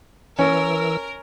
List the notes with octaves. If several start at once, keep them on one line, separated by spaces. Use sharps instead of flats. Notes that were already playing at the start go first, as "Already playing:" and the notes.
E3 C#4 A#4 E6